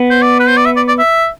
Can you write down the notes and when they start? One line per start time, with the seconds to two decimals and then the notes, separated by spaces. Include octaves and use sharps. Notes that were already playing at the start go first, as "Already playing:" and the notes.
Already playing: B3
0.11 C5
0.22 D5
0.40 B4
0.49 C5
0.57 D5
0.66 E5
0.76 D5
0.88 D5
0.99 E5